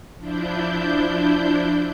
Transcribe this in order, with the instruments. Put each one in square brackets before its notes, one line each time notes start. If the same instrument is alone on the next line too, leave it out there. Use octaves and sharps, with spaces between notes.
[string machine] F3 D4 E4 G6